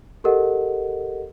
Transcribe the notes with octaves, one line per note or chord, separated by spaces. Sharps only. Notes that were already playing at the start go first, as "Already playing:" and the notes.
G4 A4 A#4 D#5 F#5